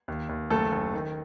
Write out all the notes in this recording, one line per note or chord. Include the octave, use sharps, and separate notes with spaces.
D#2
D#2
F#1 A3 A4
F#1
D#3